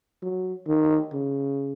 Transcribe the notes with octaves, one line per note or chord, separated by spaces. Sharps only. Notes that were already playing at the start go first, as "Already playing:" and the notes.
F#3
D#3
C#3